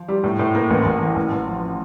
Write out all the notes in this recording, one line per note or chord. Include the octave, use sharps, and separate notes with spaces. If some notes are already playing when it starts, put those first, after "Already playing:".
Already playing: F3
G3
A2
A2
A#3
A1
A1
E3
A1
A1
F3